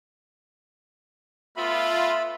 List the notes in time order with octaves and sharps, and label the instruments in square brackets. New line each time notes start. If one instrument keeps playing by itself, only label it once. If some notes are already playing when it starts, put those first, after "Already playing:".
[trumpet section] A3 B3 F4 [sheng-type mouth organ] E5 B5